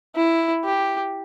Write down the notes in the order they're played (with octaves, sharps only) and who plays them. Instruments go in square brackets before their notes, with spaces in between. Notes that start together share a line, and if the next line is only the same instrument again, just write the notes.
[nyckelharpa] E4
G4